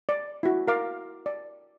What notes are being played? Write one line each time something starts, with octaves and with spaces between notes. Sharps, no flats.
D5
E4 F#4
A#4 F5 D6
D5